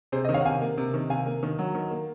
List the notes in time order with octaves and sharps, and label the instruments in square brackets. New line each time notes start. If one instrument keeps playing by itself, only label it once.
[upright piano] C3 G#4 C5
D#3 D#5
C#5 F5
F#5
C3 F5 G#5
A#3
C3
D#3
C3 F5 G#5
A#3
D#3
F#3
D#3
A#3